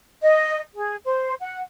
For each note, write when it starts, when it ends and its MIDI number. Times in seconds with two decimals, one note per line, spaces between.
0.22 0.58 75
0.75 0.95 68
1.05 1.33 72
1.41 1.60 78